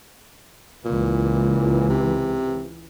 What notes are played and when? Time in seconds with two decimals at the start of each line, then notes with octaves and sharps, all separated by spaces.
0.85 C#2 A#2 E3
1.90 C3